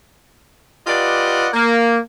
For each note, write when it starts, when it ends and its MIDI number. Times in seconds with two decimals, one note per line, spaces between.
0.87 1.48 65
0.87 1.48 67
0.87 1.48 71
0.87 1.48 74
0.87 1.48 75
0.87 1.48 78
1.54 1.98 58